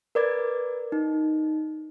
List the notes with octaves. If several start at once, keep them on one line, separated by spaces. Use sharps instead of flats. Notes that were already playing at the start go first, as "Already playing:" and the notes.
A#4 B4 D5 D6 G#6 A6
D#4